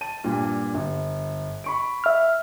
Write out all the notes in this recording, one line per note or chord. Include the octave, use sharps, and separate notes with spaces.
A5 D#7
G2 A#2
G1
B5 C#6 D7
E5 F6